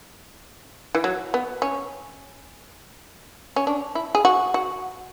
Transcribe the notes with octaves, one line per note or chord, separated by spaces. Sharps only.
E3
F#3
B3
C#4
C#4
D4
E4
G#4
F#4
F#4